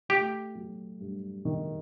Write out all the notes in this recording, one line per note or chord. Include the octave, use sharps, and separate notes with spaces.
A3 G4
F#3
G2
D#3